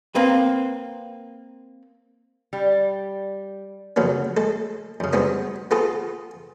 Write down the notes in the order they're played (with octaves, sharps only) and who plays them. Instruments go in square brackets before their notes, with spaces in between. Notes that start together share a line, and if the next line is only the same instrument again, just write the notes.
[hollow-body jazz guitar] A#3 C4 B4
[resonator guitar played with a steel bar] G3
[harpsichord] F2 C#3 F#3 A#3 B3
G#3 A4
F#2 C#3
G2 B2 G#3 B3 C5 D#5
B3 C4 F4 G#4 A4